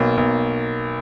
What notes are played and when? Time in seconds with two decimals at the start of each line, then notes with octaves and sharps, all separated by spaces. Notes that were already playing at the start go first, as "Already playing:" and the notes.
Already playing: B1 A#3
0.17 B1